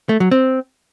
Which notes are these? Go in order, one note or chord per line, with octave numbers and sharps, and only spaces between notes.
A3
F#3
C4